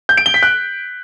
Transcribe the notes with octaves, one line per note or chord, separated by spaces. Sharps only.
G6
D7
G7
B6
F#6